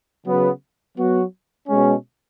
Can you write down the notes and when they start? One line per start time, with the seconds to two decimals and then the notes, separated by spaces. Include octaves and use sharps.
0.25 C#3 F#3 B3 F#4 B4
0.97 F#3 B3 F#4
1.68 B2 G#3 C#4